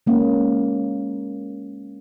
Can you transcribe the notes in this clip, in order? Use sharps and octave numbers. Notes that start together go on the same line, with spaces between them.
G#3 A#3 C#4